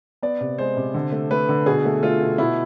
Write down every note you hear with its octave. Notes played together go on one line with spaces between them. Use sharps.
B3 D5
C3
G#3 C5
C3
D3
A3
A3 B4
D3
B2 G#4
A3
A3 F4
B2
B2 E4